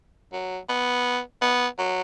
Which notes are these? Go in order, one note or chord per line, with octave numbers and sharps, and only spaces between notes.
F#3
B3
B3
F#3